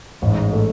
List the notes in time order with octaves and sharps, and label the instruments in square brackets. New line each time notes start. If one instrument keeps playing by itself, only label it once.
[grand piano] A1 [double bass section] G#2
[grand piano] A3